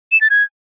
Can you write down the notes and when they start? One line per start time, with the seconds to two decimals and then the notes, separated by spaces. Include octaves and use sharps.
0.12 E7
0.21 A6
0.30 G#6